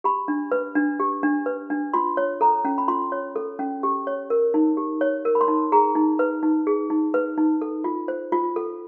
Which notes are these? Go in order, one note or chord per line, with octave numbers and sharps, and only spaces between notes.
G4 B5
D4
B4
D4
G4
D4
B4
D4
F4 C6
C#5
A4 A#5
C#4
B5
F4 C6
C#5
A4
C#4
G4
C#5
A#4
D#4
G4
C#5
A#4
B5
C6
D#4
G#4 A#5
D#4
B4
D#4
G#4
D#4
B4
D#4
A4
F4
C5
F4
A4